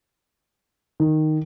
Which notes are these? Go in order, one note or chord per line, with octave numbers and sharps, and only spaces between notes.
D#3